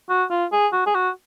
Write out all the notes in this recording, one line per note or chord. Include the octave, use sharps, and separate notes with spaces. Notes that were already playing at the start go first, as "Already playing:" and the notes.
F#4
F4
G#4
F#4
G#4
F#4